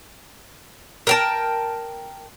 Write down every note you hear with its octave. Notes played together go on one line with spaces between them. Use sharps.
A#4 G5 A5